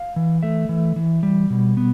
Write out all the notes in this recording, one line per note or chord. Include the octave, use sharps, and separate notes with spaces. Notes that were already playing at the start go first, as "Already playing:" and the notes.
Already playing: F5
E3
A3 E5
E3
E3
G3
B2
B3